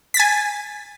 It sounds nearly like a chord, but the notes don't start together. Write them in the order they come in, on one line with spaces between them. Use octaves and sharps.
B6 A6 G#5